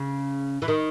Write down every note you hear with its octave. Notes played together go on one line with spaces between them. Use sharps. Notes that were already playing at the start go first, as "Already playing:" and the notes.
Already playing: C#3
E3
D#3